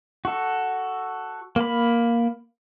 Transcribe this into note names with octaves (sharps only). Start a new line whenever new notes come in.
F#4 A4
A#3 B5